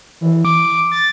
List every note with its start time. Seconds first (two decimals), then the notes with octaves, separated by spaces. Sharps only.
0.21 E3
0.45 D6
0.92 A6